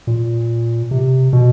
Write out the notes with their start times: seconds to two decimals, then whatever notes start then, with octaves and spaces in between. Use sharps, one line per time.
0.07 A#2
0.91 C3
1.33 B2